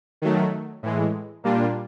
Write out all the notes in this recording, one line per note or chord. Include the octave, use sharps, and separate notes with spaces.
D#3 F#3 A3
A2 E3 G#3
A#2 G3 A#3 D4 F4